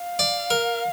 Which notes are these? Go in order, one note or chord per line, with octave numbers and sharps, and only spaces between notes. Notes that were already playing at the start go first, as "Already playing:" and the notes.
Already playing: F5
D5
A#4